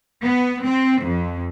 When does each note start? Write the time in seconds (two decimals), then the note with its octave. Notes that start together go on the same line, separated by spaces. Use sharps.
0.24 B3
0.66 C4
1.03 F2